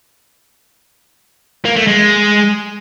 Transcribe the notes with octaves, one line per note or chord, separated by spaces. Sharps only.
A#3
A3
G#3